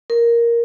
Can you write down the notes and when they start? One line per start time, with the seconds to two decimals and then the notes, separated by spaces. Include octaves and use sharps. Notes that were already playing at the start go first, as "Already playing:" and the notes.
0.10 A#4